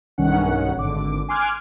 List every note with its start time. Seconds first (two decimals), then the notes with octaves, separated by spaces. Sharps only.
0.18 B1 G2 D#3 C#4 F#5
0.75 G#1 D3 D6
1.28 G#5 C6 D6 F6 F#6 G#6